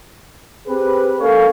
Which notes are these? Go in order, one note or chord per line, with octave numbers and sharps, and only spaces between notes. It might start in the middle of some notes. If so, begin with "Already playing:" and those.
C4 G4 G#4 B4
A#3 C#4 A4 C#5 F5